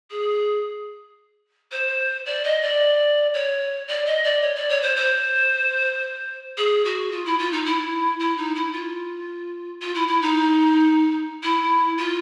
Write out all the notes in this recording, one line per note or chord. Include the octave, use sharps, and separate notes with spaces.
G#4
C5
D5
D#5
D5
C#5
D5
D#5
D5
C#5
D5
C#5
C5
C5
G#4
F#4
F4
E4
F4
D#4
E4
E4
D#4
E4
F4
F4
E4
E4
D#4
E4
F4